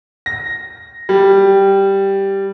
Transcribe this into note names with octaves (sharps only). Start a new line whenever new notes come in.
A#6
G3